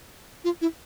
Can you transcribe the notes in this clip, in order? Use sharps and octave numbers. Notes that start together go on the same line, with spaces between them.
F4
E4